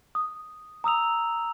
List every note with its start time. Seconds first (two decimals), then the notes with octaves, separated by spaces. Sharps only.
0.15 D#6
0.84 A#5 D#6 E6 F7